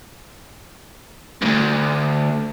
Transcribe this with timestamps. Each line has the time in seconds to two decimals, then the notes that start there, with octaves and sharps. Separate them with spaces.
1.42 D2 G2